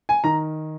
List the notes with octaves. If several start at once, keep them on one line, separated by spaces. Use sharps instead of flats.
G#5
D#3 A#5